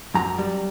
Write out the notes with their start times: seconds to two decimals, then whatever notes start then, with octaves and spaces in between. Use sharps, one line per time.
0.14 F#2 A#5
0.38 G3